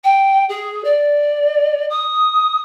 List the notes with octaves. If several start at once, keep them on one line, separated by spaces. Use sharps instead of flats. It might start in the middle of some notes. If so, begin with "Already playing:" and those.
G5
G#4
D5
D#6